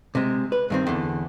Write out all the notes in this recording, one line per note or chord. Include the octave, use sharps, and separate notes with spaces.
C3 G#3
B4
G2 D#3 C4
E2 D3